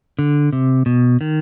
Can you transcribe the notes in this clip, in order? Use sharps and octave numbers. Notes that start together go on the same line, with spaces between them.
D3
C3
B2
D#3